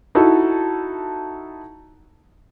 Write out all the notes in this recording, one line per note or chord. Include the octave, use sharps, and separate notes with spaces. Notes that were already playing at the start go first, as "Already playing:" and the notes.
D#4 E4 F#4 A4